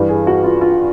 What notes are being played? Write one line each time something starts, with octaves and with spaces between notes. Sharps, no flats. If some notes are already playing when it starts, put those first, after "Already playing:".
Already playing: G2 E3 G3
G#4
F#4
F4
F4